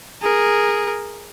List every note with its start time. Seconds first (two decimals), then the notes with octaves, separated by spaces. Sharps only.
0.22 G#4 A#4